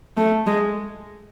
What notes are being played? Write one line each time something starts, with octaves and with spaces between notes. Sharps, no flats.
A3
G#3